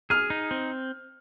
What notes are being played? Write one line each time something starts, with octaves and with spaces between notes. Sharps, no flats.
G#4 F6
D#4
C4